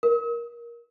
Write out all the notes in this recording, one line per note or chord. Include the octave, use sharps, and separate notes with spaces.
A#4